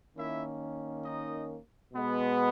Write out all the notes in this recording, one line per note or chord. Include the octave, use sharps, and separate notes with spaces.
D#3 A#3 C#4 E4 E5
D#4 D#5
B2 G#3 B3